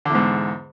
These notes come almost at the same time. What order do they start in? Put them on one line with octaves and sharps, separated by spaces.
D3 E2 G#2